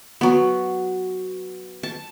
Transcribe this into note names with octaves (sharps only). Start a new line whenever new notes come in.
F#3 B3
A5